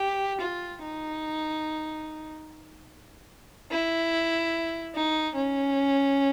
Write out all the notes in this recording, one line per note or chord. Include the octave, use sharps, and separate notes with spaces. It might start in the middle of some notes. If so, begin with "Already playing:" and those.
Already playing: G4
F4
D#4
E4
D#4
C#4